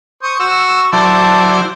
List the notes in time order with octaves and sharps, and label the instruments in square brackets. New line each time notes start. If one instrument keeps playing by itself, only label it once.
[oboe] C5 [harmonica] C#6 D#6
[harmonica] F#4 [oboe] C#6 [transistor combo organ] E6
[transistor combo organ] F#3 E4 D5 [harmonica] C5 [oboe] A5